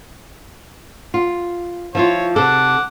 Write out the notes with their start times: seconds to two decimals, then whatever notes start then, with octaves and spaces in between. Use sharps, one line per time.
1.14 F4
1.95 F3 E4 F4 C#5
2.36 C3 A4 F#5 D6